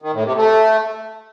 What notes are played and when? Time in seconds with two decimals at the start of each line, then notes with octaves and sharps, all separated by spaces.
0.02 D#3
0.13 A2
0.25 C3
0.36 A3